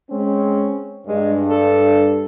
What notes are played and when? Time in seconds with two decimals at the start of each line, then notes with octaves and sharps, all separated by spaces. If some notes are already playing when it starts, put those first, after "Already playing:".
0.11 G#3 C4 C#4
1.07 G2 G#3
1.50 A4